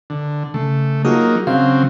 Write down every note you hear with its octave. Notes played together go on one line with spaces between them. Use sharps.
D3
C#3 A3
F#3 A#3 D#4 F4 F#4 G#4
C#3 F#3 C4 F5